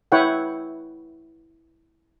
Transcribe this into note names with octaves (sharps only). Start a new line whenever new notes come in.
E4 B4 C#5 F#5 G5